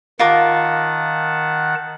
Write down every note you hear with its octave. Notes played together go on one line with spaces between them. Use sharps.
D#3 F4 A#4 F#5 A5 D6